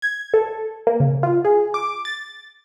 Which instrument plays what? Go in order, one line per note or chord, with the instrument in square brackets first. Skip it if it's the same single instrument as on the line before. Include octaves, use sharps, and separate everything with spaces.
[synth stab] G#6
A4
A#3
C#3
F4
G#4
D6
A6